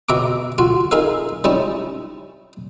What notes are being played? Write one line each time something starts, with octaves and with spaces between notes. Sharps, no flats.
B2 E5 A#5 D6
F4 F#4
D#4 G#4 A#4 E5 F5
G3 C#4 D#4 E4